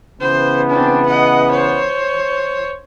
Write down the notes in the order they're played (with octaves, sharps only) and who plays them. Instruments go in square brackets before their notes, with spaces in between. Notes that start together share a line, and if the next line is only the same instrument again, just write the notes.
[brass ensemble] C#3 E3 B3 [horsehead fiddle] C5
[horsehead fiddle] C4 D4
D#5 F#5
C5 C#5